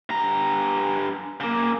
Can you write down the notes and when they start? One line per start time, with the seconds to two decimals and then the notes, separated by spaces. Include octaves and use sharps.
0.10 G2 A#5
1.40 C#3 A#3